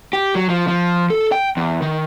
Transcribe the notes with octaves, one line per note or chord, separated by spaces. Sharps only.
G4
F#3
F3
F3
A4
G5
E2
D#3